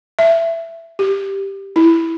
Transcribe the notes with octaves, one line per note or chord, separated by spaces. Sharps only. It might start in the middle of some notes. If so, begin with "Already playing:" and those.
E5
G4
E4